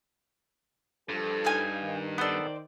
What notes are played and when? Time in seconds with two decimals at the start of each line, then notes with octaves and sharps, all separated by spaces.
1.09 G2 F3 A4
1.45 D#4 F5 G#5
1.83 D#3
2.18 B3 A4 C5 D5